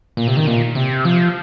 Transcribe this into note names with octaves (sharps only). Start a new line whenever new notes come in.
A#2
C3
D#3
A#2
C3
F3